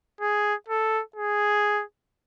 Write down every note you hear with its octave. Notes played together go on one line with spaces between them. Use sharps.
G#4
A4
G#4